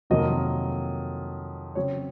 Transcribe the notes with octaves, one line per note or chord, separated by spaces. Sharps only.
F2 C3 D#3 F#3 A#3 D#5
C#3 F#3 C4 C#5